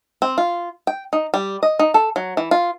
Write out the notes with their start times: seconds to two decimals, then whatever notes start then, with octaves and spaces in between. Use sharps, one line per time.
0.22 C4
0.38 F4
0.87 G5
1.13 D#4
1.34 G3
1.63 D#5
1.79 D#4
1.94 A4
2.16 F#3
2.37 E3
2.51 F4